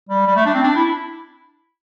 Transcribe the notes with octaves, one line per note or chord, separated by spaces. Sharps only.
G3
G3
A3
D4
C4
D4
E4